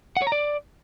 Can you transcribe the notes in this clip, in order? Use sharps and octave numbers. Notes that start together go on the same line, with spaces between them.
F#5
C#5
A#5
D5